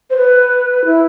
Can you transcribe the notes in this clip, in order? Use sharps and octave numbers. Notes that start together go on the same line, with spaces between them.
C5
B4
E4